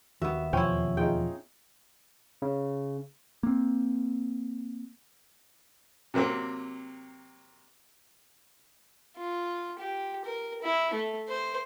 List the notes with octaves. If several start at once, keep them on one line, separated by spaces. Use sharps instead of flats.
D#2 B3 F#4 E5
E2 B2 F3 C#4 E4 C5 G5
D#4 F4 G#4 G5
C#3
A#3 C4
C3 F#3 A#3 C4
F4
G4
A#4
E4
A3
C5